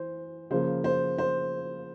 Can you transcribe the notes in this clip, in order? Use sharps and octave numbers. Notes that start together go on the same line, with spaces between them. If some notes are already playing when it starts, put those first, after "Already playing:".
Already playing: E3 C5
C#3 F3 A#3 C5
C5
C5